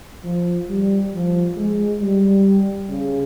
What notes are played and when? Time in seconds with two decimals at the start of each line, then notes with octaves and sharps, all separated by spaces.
0.24 F3
0.69 G3
1.13 F3
1.57 G#3
2.01 G3
2.90 C#3